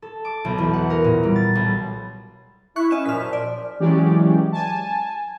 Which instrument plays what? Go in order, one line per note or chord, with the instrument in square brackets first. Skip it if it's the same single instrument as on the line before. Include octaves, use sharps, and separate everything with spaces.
[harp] A4
D6
B1
E2
F#5
A#4
A#2
G3
A6
B1
[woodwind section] E4 [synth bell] C#6 F#6
[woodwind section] C#4 [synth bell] D#5 E7
[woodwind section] F#2 A#2 F3 [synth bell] F6 B6
[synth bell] D5
[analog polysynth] E3 F#3 G#3 C#4 G4 D5
G#5 A5